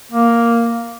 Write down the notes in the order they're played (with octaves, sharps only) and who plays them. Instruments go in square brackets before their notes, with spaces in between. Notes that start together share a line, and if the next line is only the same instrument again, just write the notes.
[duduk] A#3